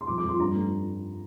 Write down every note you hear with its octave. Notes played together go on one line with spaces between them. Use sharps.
C6
F2 D6
D6
F2
C6
G2 A#5
A3